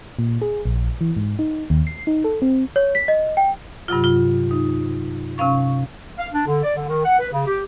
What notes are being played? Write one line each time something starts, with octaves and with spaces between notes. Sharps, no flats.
A#2
G#4
A#1
E3
G#2
D#4
D#2
C7
D#4
A4
C4
C#5
B6
D#5
G5
G2 C3 F#3 F4
F4
D#4
C3 C#4 F5 C#6
F5
D4
D3
D5
D3
D#3
F#5
B4
C#3
G4